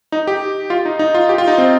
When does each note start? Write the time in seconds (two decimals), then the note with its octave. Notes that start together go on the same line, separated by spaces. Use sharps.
0.12 D#4
0.27 G4
0.70 F4
0.85 D#4
0.99 D#4
1.15 F4
1.29 G4
1.38 F4
1.48 D#4
1.58 C4